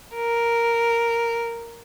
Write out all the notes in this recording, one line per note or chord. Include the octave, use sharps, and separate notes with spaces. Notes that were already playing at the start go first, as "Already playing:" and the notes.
A#4